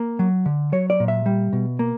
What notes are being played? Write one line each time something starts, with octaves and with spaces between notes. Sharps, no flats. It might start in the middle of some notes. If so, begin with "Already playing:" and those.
Already playing: A#3
F#3
D3
F#3 C#5
D5
A#2
E5
G3
B2
A#3